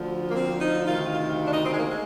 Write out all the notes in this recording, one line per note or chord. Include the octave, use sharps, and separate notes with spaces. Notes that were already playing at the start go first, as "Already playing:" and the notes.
Already playing: D2 D3 F3
A#3
C4
D#4
D2 C3 D#3 F4
F4
D4
D#4
C4
G#3
A#3
G#3